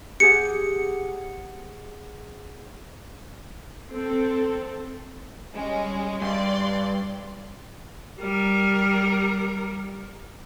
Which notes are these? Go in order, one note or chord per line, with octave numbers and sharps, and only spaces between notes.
G4 G#4 F#5 C#7
C4 A4
G3 G#3 C#4
G2 D5 C6
G3 A#4